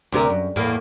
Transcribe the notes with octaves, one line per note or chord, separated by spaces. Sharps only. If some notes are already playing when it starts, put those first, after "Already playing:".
D2 C3 A#4
F#2
E2 A2 A#3